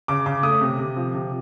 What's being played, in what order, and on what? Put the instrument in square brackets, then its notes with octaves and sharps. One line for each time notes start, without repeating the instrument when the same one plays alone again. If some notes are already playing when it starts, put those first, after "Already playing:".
[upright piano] C#3 D6
C#3 D6
A3 D#6
C3
C3
F3
C3